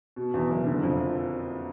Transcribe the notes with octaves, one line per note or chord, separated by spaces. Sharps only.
B2
E2
F#1
D3
F2